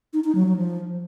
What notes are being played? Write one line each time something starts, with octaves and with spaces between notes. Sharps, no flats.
D#4
D#4
F#3
F#3
F3